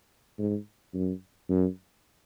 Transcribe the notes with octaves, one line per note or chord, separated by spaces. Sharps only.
G#2
F#2
F#2